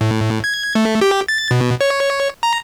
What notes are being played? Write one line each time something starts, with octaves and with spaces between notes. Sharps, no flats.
A2
G#6
A3
G4
A6
B2
C#5
A#5